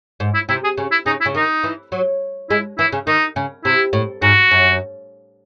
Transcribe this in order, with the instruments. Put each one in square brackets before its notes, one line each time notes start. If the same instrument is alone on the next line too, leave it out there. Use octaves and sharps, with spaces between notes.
[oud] G#2
[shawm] E4
[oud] C3 [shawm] E4
[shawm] G#4
[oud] C#3
[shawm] E4
[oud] C#3 [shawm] D#4
[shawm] E4
[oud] C#3
[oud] D#3 [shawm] D#4
[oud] E3
F#3
[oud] G#3 [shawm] E4
[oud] E3 [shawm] E4
[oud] C#3
[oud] D#3 [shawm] D#4
[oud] C#3
[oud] C3 [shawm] E4
[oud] A2
[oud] G#2 [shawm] F#4
[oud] F#2